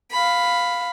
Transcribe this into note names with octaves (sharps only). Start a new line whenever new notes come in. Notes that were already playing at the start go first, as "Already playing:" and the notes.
F5 B5